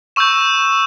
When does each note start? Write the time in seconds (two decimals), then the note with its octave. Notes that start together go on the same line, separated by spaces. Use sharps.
0.16 C#6 E6 G6 E7